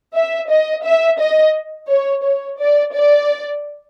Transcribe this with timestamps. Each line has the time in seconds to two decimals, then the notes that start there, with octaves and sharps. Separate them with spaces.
0.14 E5
0.49 D#5
0.84 E5
1.19 D#5
1.88 C#5
2.23 C#5
2.58 D5
2.94 D5